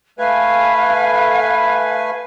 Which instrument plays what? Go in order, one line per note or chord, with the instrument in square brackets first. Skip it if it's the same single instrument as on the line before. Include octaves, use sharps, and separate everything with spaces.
[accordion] A3 B4 G#5 [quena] F5